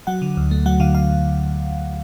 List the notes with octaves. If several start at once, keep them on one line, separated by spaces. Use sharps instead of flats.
F#3 F#5
D3
D2
A3
F#3 F#5
D3 F5
F5